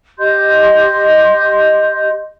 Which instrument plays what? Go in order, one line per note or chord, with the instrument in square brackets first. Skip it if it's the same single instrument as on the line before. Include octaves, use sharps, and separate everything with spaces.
[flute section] G4 D#5 C6 G6